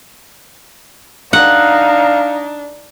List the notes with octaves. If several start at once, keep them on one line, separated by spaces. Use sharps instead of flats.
D4 D#4 F5 F#5